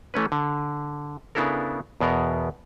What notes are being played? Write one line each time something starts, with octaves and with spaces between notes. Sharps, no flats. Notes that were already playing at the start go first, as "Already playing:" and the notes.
E3 A3 C#4 B4
D3
C#3 B3 D4 E4 A4 A#4
E2 B2 B3 A#4